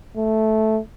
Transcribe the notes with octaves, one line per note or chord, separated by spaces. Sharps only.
A3